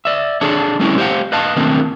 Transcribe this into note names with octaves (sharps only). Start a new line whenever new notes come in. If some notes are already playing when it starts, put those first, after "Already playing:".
D5 E5
D4 G#4 A4 C#5 A5
G3 A3 A#3 C4 C#4 E4
G4 C5 C#5 F5 F#5
B4 D#5 F5 A5
D#3 A3 A#3 C4 D4